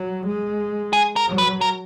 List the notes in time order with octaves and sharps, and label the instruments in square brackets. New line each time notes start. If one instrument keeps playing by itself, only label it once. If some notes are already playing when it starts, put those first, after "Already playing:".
Already playing: [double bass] F#3
G#3
[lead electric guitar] G#4
A#4
[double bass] F#3
[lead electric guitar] B4
A#4